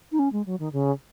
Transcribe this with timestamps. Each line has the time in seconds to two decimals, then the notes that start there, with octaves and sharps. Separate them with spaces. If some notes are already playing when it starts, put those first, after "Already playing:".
0.12 D#4
0.19 C#4
0.32 G#3
0.46 F#3
0.59 D#3
0.73 C#3